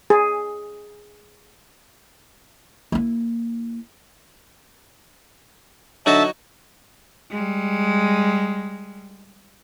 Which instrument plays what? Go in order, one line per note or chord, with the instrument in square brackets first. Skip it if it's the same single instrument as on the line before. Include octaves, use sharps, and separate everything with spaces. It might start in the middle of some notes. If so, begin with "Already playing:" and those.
[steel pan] G#4
[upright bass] A#3 E4
[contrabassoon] D3 [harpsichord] F#3 D#4 F#4 [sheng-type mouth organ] E5 A5
[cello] G3 G#3